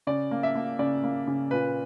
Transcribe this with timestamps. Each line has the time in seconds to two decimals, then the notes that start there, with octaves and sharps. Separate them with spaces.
0.07 C#3 D5
0.31 A#3
0.43 E5
0.55 A#3
0.79 C#3 D5
1.03 A#3
1.27 C#3
1.51 A#2 B4